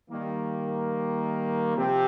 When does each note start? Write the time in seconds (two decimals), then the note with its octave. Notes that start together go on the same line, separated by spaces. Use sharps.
0.10 D#3 G3 A#3
1.76 C3 F3 C4 G4